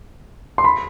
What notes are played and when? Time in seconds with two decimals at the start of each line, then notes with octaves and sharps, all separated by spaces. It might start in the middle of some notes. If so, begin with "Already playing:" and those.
0.58 C6
0.64 B5